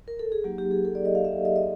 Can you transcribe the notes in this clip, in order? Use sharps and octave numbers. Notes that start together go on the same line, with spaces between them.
A#4
A4
G#4
F#3 A#3 D#4 G4
G4
G#4
A4
D5
D#5
F5
E5
D#5
D#5